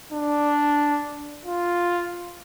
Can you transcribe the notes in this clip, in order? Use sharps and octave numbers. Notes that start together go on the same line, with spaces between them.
D4
F4